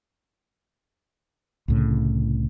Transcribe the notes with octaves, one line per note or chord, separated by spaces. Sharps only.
C2 A2 C#3